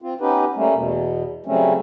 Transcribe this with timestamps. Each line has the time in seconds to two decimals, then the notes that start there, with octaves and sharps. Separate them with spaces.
0.02 C4 F4
0.21 B3 C#4 D#4 G4 B4
0.56 G3 A3 A#3 C#4
0.74 E2 B2
1.46 C#3 F#3 G3 A3 C4 C#4